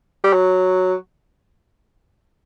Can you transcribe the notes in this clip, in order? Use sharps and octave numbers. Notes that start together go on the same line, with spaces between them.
G3
F#3